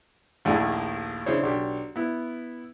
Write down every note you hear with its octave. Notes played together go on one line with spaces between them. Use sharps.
A#1 D#2 A#2 A3 E4 G#4
C#3 D4 E4 C5 C#5
B1 D4 G4
B3 E4